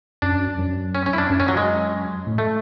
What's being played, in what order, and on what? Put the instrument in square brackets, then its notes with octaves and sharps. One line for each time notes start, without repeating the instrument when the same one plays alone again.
[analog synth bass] F#2 [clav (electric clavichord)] D4
[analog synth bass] F#2
[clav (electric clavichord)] C#4
C#4
E4
D4
[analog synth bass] F#2
[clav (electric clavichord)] C#4
F#3
G#3
[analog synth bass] A2
[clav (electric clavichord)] A3